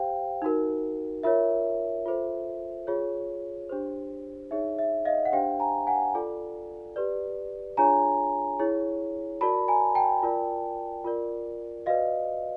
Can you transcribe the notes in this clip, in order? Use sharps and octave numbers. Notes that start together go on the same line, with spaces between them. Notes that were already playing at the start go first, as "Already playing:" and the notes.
Already playing: G4 C5 F5 G5
D#4 F#4 A#4
F4 A#4 C#5 E5
F4 A4 C5
F4 G#4 C#5
D4 G4 C5
D#4 G#4 C#5 E5
E5
D#5 F5
F#5
D4 G4 C5 F5 G5
G#5 A#5
F#5 G#5
F4 A4 D5
G4 B4 D5
D4 F4 G#4 C#5 G#5 A#5
E4 G#4 C#5
F#4 A#4 D5 A5 B5
G#5 A#5
G5 A5
F4 A#4 D5
F4 A#4 D5
F#4 B4 D5 D#5 F5